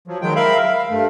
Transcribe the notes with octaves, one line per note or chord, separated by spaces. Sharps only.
F3 F#3
D#3 F#3 G#3 G5
A#4 E5 F5 B5
F5
G2 A3